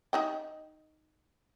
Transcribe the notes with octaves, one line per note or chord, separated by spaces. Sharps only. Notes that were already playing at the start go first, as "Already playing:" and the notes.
D#4 D#5 G5